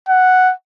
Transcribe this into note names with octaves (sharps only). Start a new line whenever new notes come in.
F#5